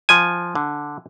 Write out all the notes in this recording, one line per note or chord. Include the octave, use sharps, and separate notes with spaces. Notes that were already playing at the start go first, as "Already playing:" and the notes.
F3 G#5
D3